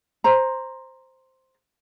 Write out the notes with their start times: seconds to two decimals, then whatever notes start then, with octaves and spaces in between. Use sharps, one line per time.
0.24 C5 A#5